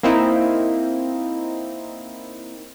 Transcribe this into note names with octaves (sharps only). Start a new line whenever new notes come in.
A#3 C4 D#4 E4